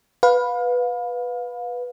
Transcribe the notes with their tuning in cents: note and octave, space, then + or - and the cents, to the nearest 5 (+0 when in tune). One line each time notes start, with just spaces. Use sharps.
B4 +0 F5 +30